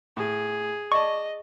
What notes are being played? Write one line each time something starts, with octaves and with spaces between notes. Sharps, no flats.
A2 G#4
D5 D#5 A5 C#6